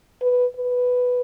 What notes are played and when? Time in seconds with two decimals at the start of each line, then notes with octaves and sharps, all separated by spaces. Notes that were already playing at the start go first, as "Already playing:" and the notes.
0.22 B4
0.57 B4